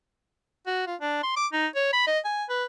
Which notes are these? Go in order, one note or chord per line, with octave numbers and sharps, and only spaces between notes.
F#4
F4
D4
C6
D6
D#4
C#5
B5
D#5
G#5
B4